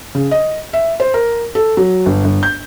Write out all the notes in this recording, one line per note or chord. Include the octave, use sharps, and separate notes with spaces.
C#3
D#5
E5
C5
A#4
A4
F#3
G1
G1
G6